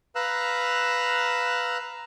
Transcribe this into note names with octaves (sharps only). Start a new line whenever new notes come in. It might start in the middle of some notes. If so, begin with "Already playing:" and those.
B4 F5 A#5 E6 F#6